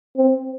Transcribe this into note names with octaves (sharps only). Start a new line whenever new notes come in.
C4